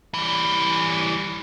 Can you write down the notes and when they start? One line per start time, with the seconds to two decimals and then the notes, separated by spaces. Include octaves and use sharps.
0.14 E3 G3